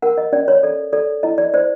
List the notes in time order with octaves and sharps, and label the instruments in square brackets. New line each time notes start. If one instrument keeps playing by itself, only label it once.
[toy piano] A#4 F#5
D#5
C#4 D5
C#5
A4 D5
A4 D5
E4 D#5
D5
C5 D5